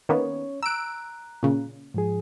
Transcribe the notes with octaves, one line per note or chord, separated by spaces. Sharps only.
D#3 A#3 B3 C#4 C#5
A#5 E6 F#6 D7
A#2 C#3
G#2 F3 G#4